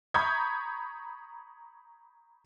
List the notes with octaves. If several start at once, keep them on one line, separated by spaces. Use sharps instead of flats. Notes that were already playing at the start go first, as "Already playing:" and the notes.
A#5 B5 C#6 D#6 G6 G#6